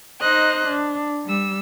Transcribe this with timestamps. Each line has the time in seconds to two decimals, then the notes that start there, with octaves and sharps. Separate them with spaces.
0.21 D#4 C5 D#5 F#6
0.65 D4
1.24 G3 E6